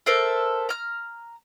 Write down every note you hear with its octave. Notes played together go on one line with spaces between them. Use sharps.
A4 A#4 C5 E5
A#5 F6